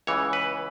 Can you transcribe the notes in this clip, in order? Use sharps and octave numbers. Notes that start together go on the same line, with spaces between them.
C#2 C#3 E3 C#5
B4